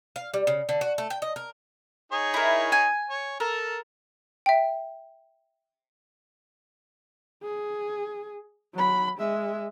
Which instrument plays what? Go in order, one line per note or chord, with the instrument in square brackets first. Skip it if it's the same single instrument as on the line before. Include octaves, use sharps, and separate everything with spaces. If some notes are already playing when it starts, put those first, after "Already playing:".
[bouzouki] F5
G3
C#3
D3
F#4
A3
G5
D#5
A#4
[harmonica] D#4 G#4 C#5
[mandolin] E4 A#4
G#5
[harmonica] C#5
[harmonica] A4 [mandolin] A#4
[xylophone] E5 G5
[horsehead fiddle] G#4
F#3 B5
G#3 E5